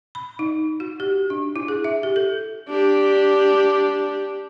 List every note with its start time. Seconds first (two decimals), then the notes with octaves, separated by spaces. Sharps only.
0.15 B5
0.39 D#4
0.80 F#4
1.00 G4
1.30 D4
1.56 E4
1.68 G#4
1.84 E5
2.03 G4
2.16 A4
2.69 D4 G4